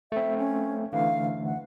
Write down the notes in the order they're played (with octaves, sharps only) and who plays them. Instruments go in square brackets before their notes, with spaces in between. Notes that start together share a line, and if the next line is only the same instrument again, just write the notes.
[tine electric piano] A3 C4 [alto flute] E5
[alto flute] C#4
[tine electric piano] D3 E3 A3 [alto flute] F5
[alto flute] F#5